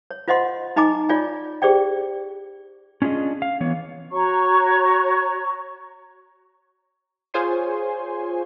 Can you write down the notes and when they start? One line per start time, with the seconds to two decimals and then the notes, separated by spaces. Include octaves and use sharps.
0.11 C#5
0.28 F4 C5 D#5 F#5 C6
0.76 D#4 D#5 G#5 A#5 D6
1.09 F4 C#5 D5 G#5
1.62 G4 G#4 C5 D5 G5
3.02 C#4 D4 F4 G#4 D#5
3.42 F5
3.60 E3 B3 C#5
4.11 F#4 C#5 A#5 C#6
7.34 F4 G#4 C5 C#5 G#5 C6